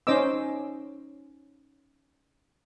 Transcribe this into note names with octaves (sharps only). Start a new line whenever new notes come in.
C#4 D#4 C5 D#5 D6 E6